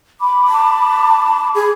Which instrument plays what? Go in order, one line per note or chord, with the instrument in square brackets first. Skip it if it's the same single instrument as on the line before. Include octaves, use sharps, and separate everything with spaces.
[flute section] B5 D6
[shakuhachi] A5
G#4